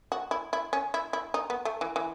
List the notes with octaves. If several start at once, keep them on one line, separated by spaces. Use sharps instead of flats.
F#4
E4
E4
C#4
E4
E4
D#4
B3
A3
E3
E3